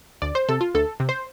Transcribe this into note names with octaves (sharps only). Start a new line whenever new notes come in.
D2 D5
C5
C3 A4
F4
D2 A4
C3
C5